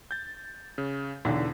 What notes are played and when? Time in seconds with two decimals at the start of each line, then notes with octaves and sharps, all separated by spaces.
0.11 G6 A6
0.78 C#3
1.25 B1 E2 D3 E3